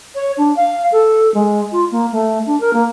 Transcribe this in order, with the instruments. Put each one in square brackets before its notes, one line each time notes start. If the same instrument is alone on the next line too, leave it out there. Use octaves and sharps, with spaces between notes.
[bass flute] C#5
D4
F5
A4
G#3
F4
A#3
A3
D4
A#4
A#3